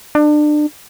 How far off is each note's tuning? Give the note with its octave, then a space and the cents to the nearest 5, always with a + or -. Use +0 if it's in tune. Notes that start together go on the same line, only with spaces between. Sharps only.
D4 +30